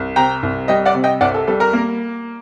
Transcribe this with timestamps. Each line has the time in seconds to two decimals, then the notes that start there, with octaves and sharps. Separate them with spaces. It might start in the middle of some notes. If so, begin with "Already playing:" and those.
Already playing: C2
0.16 C3 G5 A#5
0.43 C2
0.68 G3 D#5 G5
0.86 D5 F#5
0.94 C3
1.04 D#5 G5
1.21 C2 D5 F#5
1.34 A4
1.48 G3 A4
1.60 A#4
1.73 A#3